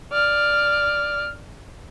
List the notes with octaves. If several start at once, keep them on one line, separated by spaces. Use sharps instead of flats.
D5 F6